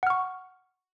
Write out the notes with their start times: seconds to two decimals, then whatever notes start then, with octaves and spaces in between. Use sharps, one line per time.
0.03 F#5
0.07 F6
0.10 C#6